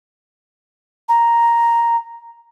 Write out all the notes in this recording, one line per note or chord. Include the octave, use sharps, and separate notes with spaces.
A#5